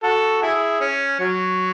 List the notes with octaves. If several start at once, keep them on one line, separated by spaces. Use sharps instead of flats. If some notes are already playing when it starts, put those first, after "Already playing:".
F#4 A4
E4 G#4
C#4
F#3